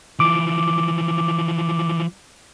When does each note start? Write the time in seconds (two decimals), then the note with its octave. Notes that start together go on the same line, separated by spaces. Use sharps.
0.20 E3 F3 D6